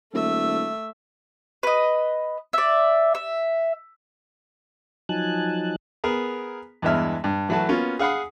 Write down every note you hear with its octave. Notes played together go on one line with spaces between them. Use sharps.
D#1 A3 E5
B4 D#5
D5 E5
E5
F3 F#3 D#4 G#5 A5 F#6
B3 G#4 A#4
E2 G2 E3 G#3 E5 F6
G2
E3 F#3 A3 F#4 B4 A5
A#3 B3 C#4 F4 F#4
G#4 F5 F#5 B5 D#6